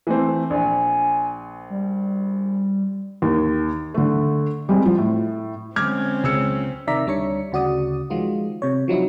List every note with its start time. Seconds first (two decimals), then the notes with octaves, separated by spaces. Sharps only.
0.07 E3 A3 C4
0.50 A#1 G#5
1.70 G3
3.22 D#2
3.94 D3 A3
4.69 G3 G#3 C4
4.85 F3
4.98 A2
5.76 D3 F#3 G#3 C4 C#4 D6 F6 G#6
6.24 C#2 C#3 E6 C#7
6.87 C3 D#3 D5 E5 A#5 B6
7.06 D2 G3 D4 C#5 C#7
7.52 D2 C#3 F#4 D5 D#6
8.10 D#3 F3 G#3 F4 F#4
8.62 C3 C#5
8.88 F3 F#3 D#4 E4